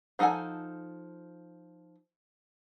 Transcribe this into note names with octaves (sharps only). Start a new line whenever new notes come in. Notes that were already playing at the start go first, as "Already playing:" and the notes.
F3 D#4 A4 F#5 G#5